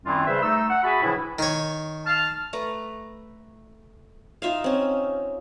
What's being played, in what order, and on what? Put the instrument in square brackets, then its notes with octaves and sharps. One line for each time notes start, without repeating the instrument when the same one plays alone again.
[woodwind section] F#2 D#3 G3 C4 E4 F4
C#3 G3 B4 C5 E5
A3 D#4 E6
F#5
F#4 G#4 E5 G#5 A5 B5
A2 C#3 E3 F3 D4 E4
[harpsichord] D#3 C#5
[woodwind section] A5 F6
[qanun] A3 B4 A#5
D#4 F4 E5 F5
C4 C#4